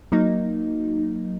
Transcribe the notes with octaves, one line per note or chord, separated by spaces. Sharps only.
F#3 A#3 D#4